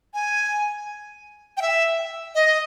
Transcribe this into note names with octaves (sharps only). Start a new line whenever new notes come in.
G#5
G5
E5
D#5